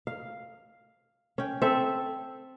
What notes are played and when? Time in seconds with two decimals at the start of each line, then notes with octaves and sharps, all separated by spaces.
0.07 F5
1.38 C#4 G5
1.62 C4 A4 E5